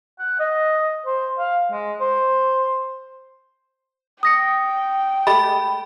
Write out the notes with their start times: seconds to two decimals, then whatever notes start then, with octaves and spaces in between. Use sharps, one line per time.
0.19 F#5
0.39 D#5
1.06 C5
1.38 F5
1.72 G#3
2.00 C5
4.23 G5 D#6 A#6 C#7
5.27 G#3 A3 G4 B5 A6